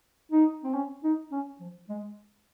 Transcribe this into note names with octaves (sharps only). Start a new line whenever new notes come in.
D#4
C4
C#4
D#4
C#4
F3
G#3